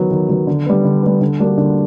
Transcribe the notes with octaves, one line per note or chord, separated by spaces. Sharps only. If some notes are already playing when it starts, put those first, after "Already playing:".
Already playing: D#3 F#3 B3
D#3
F#3 B3
D3
G3 B3
D3
G3 B3
D3
G3 A#3 D4 F#4
D3